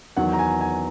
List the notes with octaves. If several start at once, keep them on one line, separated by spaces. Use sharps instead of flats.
E2 D#3 F#3 F#5
A#5
G#5
G#5